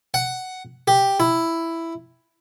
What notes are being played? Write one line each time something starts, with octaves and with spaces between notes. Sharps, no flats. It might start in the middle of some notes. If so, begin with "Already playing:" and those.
F#5
G4
E4